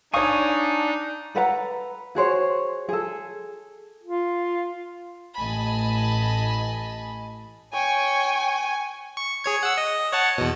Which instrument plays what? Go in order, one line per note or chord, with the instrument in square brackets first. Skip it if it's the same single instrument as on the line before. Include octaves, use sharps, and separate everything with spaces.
[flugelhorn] D4 [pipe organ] D#4 [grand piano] C#5 F5 [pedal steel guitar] G#5 C#6 D#6
[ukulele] A4 B4 F#5 A#5
F#4 G#4 C5 C#5
G#4 A4
[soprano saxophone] F4
[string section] A1 D#5 G#5 A5 B5
[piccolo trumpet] C#5 [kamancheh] G5 C#6 [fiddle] G#5
[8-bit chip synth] C#6
G#4 C#5 G#6
F#5 E6
D#5
C#5 F#5 A5
E2 B2